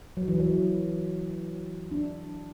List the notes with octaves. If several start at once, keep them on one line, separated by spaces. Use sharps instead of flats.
F#3
E3
F#3
D4